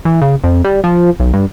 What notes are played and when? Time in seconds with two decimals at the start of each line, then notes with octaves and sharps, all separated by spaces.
0.05 E3
0.22 C#3
0.44 F2
0.64 G3
0.84 F3
1.20 B1
1.34 G2